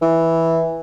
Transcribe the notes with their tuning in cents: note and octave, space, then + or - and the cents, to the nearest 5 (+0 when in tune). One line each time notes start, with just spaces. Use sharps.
E3 -5